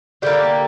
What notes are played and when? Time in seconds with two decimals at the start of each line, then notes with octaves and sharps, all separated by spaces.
0.22 D3 G3 A#3 G4